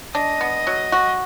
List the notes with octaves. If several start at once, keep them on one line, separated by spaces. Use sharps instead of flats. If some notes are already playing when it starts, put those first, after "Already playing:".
D4 D#5
B3
F#3
F#4